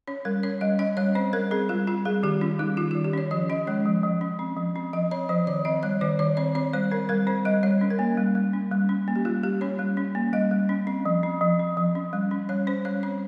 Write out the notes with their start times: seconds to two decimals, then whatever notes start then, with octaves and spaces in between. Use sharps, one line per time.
0.07 C#4 C#5
0.25 G3 A#4
0.43 C#4 C#5
0.61 G3 D#5
0.79 C#4 D#5
0.97 G3 C#5
1.15 C4 C5
1.33 G3 A#4
1.51 C4 G#4
1.69 G3 F4
1.87 C4 F4
2.05 G3 G#4
2.23 D#3 G4
2.41 C#4 F4
2.59 G3 D#4
2.77 D#3 F4
2.91 F4
2.95 D#3
3.04 G4
3.13 C#4 C#5
3.31 F3 C#5
3.50 C#4 D#5
3.67 G#3 C#5
3.85 F3
4.03 F3
4.21 C#4
4.39 C4
4.57 F3
4.76 C4
4.93 F3 D#5
5.11 C4 C#5
5.29 F3 C5
5.47 D#3 C#5
5.65 C4 D#5
5.83 G3 C#5
6.01 D#3 C5
6.19 D#3 C#5
6.37 C4 C#5
6.55 C4 C#5
6.73 G3 C5
6.91 C4 A#4
7.09 G3 A#4
7.27 C4 C5
7.45 G3 D#5
7.63 G3 C#5
7.81 C#4
7.90 A#4
7.99 A#3
8.17 G3
8.35 G3
8.53 C#4
8.71 G3
8.89 C#4
9.08 A#3
9.16 G4
9.25 G3 F4
9.43 G3 G4
9.61 C#4 C#5
9.79 G3
9.97 C#4
10.15 A#3
10.33 G3 D#5
10.51 G3
10.69 C#4
10.87 C4
11.05 F3
11.23 C4
11.41 F3
11.59 C4
11.77 F3
11.95 C#4
12.13 G3
12.31 C#4
12.49 G3 C#5
12.67 C#4 C5
12.85 G3 C#5
13.03 C4 C#5